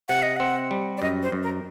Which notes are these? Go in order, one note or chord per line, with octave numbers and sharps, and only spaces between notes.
C3 F#5
D#5
C4 F#5
G3
D5
F#2 D#5
C5
F#2
A#4